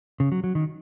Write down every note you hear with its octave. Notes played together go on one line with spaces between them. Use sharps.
C#3
F#3
F#3
D#3